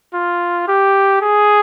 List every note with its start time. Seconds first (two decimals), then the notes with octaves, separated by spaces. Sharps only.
0.14 F4
0.68 G4
1.21 G#4